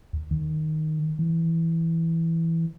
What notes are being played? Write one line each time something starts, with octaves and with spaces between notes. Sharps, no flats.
D#2
D#3
E3